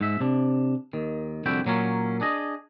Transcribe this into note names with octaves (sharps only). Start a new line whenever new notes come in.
G#2 E5
C3 D4
D#2 D#3
C2 F2 D3 E4 F#4 G5
A#2 F#3 A#3 C#4
D4 G#4 D#5